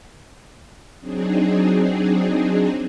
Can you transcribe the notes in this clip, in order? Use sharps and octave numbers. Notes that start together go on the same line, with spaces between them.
F#3 C4 D4 D#4 G#4